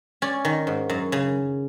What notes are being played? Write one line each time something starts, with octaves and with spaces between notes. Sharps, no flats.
C#4 D5
D#3
G#2
F#2
C#3